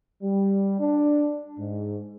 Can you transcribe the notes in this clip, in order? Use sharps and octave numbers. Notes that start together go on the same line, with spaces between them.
G3
D4
G#2